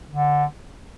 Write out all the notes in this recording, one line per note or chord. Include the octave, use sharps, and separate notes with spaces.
D3